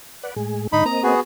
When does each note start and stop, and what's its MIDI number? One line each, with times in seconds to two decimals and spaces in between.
0.23 0.34 71
0.23 0.34 74
0.23 0.34 78
0.36 0.67 45
0.36 0.67 56
0.36 0.67 68
0.73 0.83 44
0.73 0.83 50
0.73 0.84 63
0.73 0.84 83
0.85 1.15 58
0.85 1.15 60
0.85 1.15 75
0.85 1.03 82
1.03 1.20 59
1.03 1.20 66
1.03 1.20 68